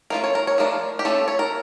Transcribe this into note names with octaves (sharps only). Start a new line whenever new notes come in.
F3 A3 C#4 F4 A#4
C#5
A#4
C#5
F3 A3 D4 F4 A#4
G4
A3 C#4 F4 A4
C#5
A#4